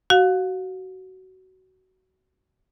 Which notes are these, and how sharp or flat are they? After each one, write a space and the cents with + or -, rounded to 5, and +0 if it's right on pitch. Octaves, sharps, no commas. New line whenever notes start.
F#4 +20 F5 +35